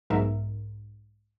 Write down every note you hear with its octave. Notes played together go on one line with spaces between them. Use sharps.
B1 G#2 A#4 E5